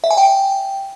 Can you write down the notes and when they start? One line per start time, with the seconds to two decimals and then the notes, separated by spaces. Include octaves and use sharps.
0.04 E5
0.11 G#5
0.17 G5